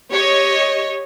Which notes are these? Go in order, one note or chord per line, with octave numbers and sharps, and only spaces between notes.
G4 C#5 D#5